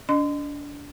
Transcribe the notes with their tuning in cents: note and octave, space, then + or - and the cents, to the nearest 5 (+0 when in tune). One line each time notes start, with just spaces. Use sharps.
D4 -30 D#5 -35 C6 -35